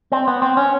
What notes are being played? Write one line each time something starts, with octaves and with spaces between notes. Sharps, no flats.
C4
B3
C4
C#4